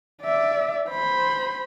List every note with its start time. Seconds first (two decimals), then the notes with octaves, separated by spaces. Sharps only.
0.23 D5 E5
0.89 C5 B5